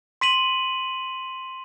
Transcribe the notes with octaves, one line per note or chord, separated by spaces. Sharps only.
C6 B6 D#7 F#7